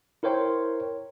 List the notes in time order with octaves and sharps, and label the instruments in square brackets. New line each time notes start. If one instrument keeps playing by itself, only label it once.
[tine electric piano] E4 A#4 C5 C#5 G5 C6